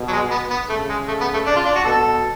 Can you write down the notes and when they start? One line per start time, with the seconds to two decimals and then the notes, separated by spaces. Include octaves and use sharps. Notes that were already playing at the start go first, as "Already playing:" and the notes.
Already playing: B2
0.08 F#3
0.12 G#3
0.31 B3
0.51 B3
0.69 C#3 A3
0.89 G#3
1.08 A3
1.21 B3
1.34 A3
1.46 D4
1.56 F4
1.66 D4
1.75 F#4
1.85 B2 A4